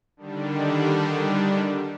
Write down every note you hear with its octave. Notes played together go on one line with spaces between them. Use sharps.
D3 D#3 G3 D4